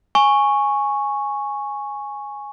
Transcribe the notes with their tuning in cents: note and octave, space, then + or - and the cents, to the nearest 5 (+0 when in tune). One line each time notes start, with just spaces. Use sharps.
G#5 +0 C#6 -5